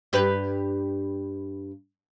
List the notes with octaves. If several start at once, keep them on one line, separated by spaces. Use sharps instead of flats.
G2 G4 B4